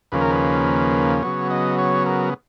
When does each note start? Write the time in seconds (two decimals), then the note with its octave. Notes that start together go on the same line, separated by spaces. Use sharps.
0.12 D#2 C#3 F3 A#3 C#4 B4
0.21 A#4
0.31 B4
1.23 C#3 F#3 B3 C#5
1.50 D#5
1.78 C#5
2.06 A#4